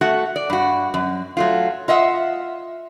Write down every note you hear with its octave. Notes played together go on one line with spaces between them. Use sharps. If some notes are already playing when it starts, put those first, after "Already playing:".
A3 F#4 F#5
D5
G2 F#4
F#2
F#3 A3 F4
F4 D#5 E5 F#5